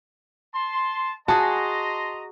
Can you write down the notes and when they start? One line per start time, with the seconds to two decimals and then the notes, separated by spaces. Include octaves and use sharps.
0.55 A5 C6
1.28 F#4 G#4 D#5 A5 A#5 C6